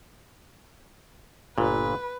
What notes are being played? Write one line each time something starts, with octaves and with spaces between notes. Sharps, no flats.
G1 A#2 B4